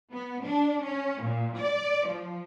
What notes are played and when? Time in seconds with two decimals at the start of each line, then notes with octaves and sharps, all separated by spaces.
0.12 B3
0.44 D4
0.82 C#4
1.23 A#2
1.58 D5
2.08 F3